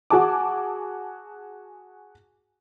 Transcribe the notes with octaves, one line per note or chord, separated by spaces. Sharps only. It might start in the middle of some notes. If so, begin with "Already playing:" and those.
F#4 G#4 G#5 A5 D6